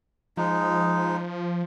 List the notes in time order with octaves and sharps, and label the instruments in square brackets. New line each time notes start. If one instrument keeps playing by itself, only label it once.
[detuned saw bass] F3 [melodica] G#3 D#4